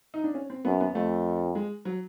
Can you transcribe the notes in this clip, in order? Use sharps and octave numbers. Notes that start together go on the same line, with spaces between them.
D#4
D4
C#4
C4
F#2 B3
B3
F2 A3
G#3
F#3